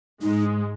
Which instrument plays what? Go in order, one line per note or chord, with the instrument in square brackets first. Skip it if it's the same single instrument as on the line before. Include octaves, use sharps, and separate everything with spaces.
[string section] G#2 G#3 [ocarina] D#4